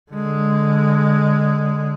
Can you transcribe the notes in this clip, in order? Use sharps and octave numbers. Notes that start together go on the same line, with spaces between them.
D3 G#3